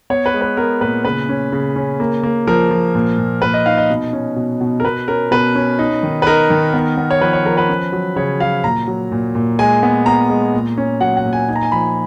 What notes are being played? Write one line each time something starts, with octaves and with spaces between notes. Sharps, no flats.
B3 C#5
B4
G#3
B4
B3 A#4
A#2 B4
C#3 B4
C#4
C#3
C#4
A#3
A#3
F3 A#4
F3
A#2
A#2
A#2 B4
D#5
D#4 F5
D#5
B2
C#4
B2
B2
A#4
B2 B4
C#4 A#4
B2 B4
C#4
D#4
D#3
B4
D#4 A#4
D#3
B3
B3
C#5
F3 B4
C#5
F3 A#4
B4
C#4
F#3
C#3 C#5
F#3 F5
A#2 A#5
F#3
A#2
A#2
G#3 G#5
B3
B3 A#5
G#3
A#2
C#4
F#3 F#5
F#5
A#2
G#5
D#4 G#5
A#5
G#5
F3 B5